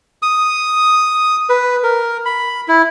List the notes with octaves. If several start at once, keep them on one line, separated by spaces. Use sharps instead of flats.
D#6
B4
A#4
B5
E4